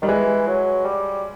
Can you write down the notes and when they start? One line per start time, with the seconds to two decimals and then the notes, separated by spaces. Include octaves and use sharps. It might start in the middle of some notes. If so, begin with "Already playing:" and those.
0.02 D#3 G3
0.08 E3 G#3
0.47 F#3
0.85 G3